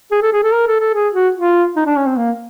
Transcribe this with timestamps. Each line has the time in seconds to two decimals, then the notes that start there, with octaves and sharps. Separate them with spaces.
0.12 G#4
0.22 A4
0.33 G#4
0.43 A4
0.53 A#4
0.67 A4
0.80 A4
0.94 G#4
1.14 F#4
1.35 F4
1.76 D#4
1.86 D4
1.96 C#4
2.07 C4
2.17 A#3